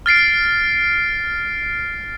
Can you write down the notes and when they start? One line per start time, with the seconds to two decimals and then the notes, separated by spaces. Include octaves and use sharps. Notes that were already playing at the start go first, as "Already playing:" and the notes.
0.06 F6 A6 C7 D7